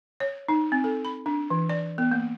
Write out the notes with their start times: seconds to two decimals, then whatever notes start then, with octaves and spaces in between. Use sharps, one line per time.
0.20 C#5
0.49 D#4
0.72 C4
0.84 A4
1.05 B5
1.26 D4
1.50 E3
1.69 D5
1.98 B3
2.11 A#3